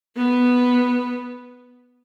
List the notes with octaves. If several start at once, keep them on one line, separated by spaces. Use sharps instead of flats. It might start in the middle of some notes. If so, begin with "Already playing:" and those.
B3